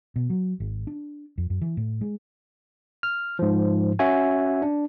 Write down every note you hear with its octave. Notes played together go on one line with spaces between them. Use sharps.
B2
F#3
G#1
D4
F2
F#2
E3
A2
G#3
F6
G#2 F3
C#4 F#4 E5 G#5
D4